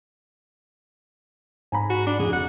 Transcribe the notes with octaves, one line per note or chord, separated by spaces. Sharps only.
G#2 G#5 A#5 B5
F#4
D4
F1 G#4
F#5